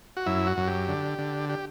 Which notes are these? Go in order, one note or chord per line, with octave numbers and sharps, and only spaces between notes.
F#4
F#2 E4
F#4
F#2
G4
D3
D3
G4